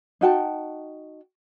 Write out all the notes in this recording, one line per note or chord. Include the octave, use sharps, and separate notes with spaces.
D#4 F#4 G5 A5